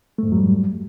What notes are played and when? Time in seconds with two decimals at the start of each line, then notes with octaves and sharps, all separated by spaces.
0.18 A3
0.23 G#2
0.28 F2
0.32 F#3
0.37 G3